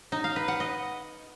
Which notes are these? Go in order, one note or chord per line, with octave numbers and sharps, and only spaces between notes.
D#4
F5
B4
F#5
D#5